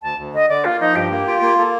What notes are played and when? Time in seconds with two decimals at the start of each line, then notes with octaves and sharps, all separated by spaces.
0.03 D2 A5
0.18 D2
0.33 D3 D#5
0.49 D3 D5
0.65 A#3 F4
0.81 F3 D#4
0.95 G2 G4
1.11 A#3
1.27 F4
1.42 A#3
1.57 A#3 A4